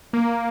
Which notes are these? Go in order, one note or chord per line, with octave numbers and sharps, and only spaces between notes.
A#3
A#3